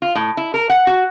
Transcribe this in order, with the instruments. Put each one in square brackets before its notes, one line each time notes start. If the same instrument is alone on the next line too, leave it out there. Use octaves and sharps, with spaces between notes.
[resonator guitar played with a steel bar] F4
A2
E4
A#4
F#5
F#4